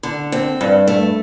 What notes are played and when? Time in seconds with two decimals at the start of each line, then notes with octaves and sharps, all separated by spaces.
0.03 D3
0.32 C4
0.61 G2
0.88 A3